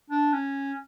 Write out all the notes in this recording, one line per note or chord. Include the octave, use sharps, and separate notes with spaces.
D4
C#4